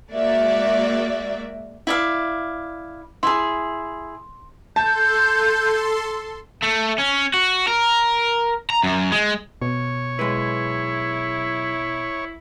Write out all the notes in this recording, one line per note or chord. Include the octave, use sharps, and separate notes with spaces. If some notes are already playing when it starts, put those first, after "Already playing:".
G#3 A#3 F#4 D5 E5
E4 D5 F5
E4 G#4 C6
A4 A5 C6 G6
A3
C#4
F#4
A#4
A#5
F#2
G#3
B2 C#5
B1 G#3 E4 B4